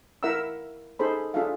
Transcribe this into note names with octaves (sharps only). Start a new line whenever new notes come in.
E4 A#4 E5 F#5 A#5 E6
D#4 G#4 A4 C5 B5
D4 F4 G#4 A4 E5 F5